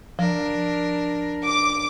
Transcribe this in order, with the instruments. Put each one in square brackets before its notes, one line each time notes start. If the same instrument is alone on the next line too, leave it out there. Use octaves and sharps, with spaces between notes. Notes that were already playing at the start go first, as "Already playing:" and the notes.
[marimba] F3 [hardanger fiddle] D4 A#4
[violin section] D6